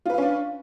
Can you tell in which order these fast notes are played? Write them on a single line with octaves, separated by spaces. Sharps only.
F4 B4 F5 C#4 D4